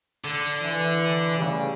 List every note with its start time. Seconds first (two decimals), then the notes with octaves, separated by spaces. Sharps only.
0.24 D3
0.62 E3
1.37 A2 C#3 G3